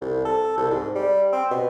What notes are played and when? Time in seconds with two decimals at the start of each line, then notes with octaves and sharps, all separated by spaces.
0.01 C2
0.25 A4
0.57 C2
0.70 G#2
0.95 G3
1.32 C4
1.51 B2